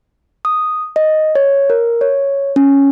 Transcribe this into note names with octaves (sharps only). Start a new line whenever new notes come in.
D#6
D#5
C#5
A#4
C#5
C#4